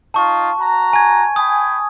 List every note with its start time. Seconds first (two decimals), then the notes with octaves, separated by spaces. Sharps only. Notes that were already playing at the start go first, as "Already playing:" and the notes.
0.14 D#4 F4 A5 C#6
0.58 F#4 A#5
0.93 G#5 G#6
1.36 G5 G#5 B5 D#6